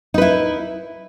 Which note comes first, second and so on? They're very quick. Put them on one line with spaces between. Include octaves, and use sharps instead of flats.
D#4 B4 E4